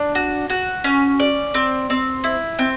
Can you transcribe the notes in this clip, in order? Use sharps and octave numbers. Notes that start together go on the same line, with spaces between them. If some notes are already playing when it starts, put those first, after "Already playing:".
Already playing: D4
F#4
F#4
C#4
D5
C4
C4
E4
C4